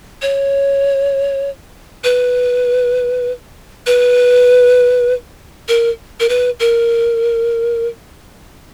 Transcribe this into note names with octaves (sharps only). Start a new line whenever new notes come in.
C#5
B4
B4
A#4
A#4
B4
A#4